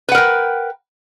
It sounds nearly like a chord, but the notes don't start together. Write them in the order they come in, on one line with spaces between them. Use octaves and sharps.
B4 F#5 A#4 G5